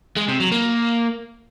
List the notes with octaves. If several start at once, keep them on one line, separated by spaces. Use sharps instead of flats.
G#3
C3
F#3
A#3